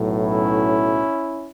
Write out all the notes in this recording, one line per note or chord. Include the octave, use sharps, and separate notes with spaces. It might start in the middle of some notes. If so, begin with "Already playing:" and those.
Already playing: B1 A2 F#3
C#4 E4